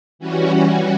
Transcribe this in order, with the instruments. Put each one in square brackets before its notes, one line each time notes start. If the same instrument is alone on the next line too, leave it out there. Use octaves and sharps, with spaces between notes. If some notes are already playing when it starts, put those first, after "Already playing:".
[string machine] E3 G3 C#4 F#4